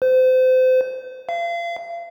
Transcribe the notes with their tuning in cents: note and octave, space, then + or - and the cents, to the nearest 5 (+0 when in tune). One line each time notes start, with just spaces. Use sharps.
C5 -30
F5 -35